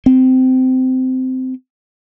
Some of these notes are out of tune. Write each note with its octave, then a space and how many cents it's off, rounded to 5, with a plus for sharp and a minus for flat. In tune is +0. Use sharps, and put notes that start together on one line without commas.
C4 -20